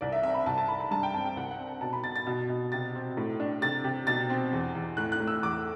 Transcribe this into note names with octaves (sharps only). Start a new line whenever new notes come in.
C2 D5
E5
C4 E5
B5
C2 A5
A5
C2 B5
B5
G2 A5
G5
C4 A5
G5
C2 F#5
F#5
C4
B2 A5
B5
B2 A6
A6
B2
B2
C3 A6
C4
A2
D4
C3 A6
C3
B2 A6
C4
E2
E2
A2 F#6
F#6
A2
E6
E2 D6